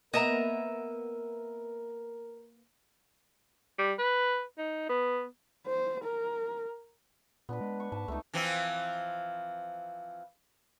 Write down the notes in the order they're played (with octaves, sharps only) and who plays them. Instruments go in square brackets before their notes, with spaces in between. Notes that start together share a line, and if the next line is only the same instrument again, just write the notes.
[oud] A#3 B3 [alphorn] A#4 [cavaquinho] D#5 E5 A#5
[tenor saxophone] G3
B4
D#4
B3
[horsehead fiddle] C5
A#4
[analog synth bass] A#2 [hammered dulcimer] B3 D4 B4
[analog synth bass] G#3
[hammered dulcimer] C#6
[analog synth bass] G#2 [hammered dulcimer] A5
[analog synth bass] C#2 [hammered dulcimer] A3 D#4
[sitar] E3 F3 C4